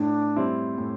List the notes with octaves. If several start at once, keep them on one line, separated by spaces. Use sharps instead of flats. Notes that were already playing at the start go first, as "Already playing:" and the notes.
Already playing: A2 D4
G3 C4 E4
A2